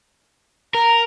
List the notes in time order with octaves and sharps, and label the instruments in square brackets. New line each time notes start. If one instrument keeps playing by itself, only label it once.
[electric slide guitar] A#4 [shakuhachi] A#5